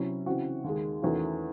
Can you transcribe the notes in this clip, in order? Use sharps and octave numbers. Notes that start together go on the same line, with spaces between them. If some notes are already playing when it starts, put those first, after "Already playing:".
Already playing: C3 F#3 C#4 E4
C#3 E3 C4 F#4
D#2 D#3 G#3
E2 D#3 A3 C#4 F#4